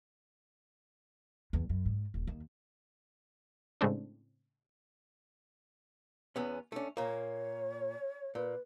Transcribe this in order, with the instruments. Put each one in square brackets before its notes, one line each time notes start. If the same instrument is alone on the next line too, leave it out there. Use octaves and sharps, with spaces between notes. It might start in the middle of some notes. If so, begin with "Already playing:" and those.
[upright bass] E2
F#2
G#2
D#1
D#2
[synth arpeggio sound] A2 C#3 G#3 C4 D4
[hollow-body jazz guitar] E2 B3 C#4
[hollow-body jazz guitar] A3 C#4 [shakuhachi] D4
[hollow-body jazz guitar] A#2 A#3 [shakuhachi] C#5
[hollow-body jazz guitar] A#2 [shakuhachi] B4